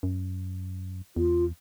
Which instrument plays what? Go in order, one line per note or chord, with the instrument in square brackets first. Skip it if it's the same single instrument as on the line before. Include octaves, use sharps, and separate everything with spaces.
[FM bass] F#2
[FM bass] E2 [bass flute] F4